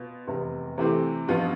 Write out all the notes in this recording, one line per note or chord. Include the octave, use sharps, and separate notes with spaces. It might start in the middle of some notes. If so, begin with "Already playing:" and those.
Already playing: B2 B3 F4
F1 E2 C3
C3 E3 A3 C4 G4
A1 G2 F3 B3 F4